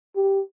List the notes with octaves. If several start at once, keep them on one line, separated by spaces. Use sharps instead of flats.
G4